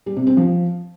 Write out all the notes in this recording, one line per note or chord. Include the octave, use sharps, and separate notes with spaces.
G3
C3
C4
F3